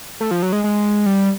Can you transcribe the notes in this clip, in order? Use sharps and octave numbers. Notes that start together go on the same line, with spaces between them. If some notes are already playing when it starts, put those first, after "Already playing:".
A3
F3
F#3
G#3
G#3
G3